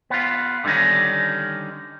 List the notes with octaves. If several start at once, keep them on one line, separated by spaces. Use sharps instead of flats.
B3 F4
D3 D#3 G3 C#4 D#4